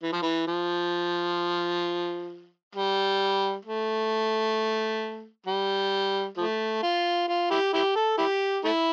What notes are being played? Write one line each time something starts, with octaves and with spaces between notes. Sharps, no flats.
E3
F3
E3
F3
G3
A3
G3
F3 A3
F4
F4
E4 G4
E4 G4
A4
E4 G4
A3 E4